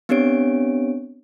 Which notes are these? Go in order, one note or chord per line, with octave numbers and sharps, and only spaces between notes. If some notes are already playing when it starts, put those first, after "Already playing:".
B3 C4 D4 G4 C#5 D7